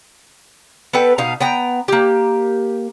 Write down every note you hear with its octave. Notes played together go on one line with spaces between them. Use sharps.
B3 A4 B4 G5
B2 D#4 F5
B3 G5 A#5
A#3 G4